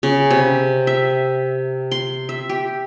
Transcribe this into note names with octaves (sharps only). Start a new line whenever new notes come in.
C#3
C3
E5
C6
E5
G4